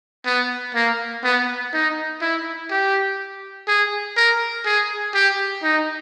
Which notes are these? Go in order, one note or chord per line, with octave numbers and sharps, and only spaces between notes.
B3
A#3
B3
D#4
E4
G4
G#4
A#4
G#4
G4
D#4